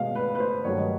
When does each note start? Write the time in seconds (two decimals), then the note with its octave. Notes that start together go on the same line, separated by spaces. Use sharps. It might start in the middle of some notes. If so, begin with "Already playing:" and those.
Already playing: B2 G#3 F5
0.15 B4
0.35 B4
0.40 C5
0.64 G2 D#3 F#3 A3 C#5
0.78 D#5